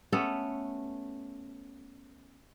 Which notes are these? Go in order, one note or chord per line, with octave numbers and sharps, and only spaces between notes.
A3 B3 C#4 A4